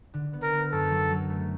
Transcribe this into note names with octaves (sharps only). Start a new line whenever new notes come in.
D3
B3
A#4
B3
F#2 A4
F#3
F#3
A3